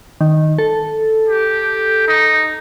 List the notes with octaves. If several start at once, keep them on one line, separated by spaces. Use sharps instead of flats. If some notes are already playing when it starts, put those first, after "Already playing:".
D#3
A4
G4
D#4